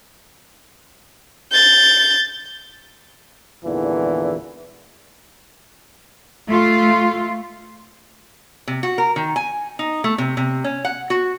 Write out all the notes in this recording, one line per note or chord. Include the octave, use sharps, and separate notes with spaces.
G6 A6
G#1 E2 A#2 D3 E3
A3 F4
C3
F#4
A#4
D#3
G#5
D#4
A3
C3
C3
C#4
F#5
F#4